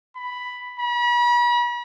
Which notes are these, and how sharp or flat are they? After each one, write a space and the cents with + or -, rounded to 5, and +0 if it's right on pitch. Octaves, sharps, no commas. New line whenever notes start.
B5 +5
B5 -40